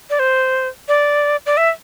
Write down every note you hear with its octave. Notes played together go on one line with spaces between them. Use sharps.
D5
C5
D5
D5
E5